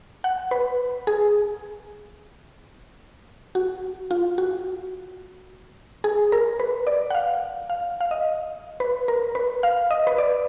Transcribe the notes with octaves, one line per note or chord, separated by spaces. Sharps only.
F#5
B4
G#4
F#4
F4
F#4
G#4
A#4
B4
D5
F#5
F5
F5
F5
D#5
B4
A#4
B4
F5
D#5
B4
D5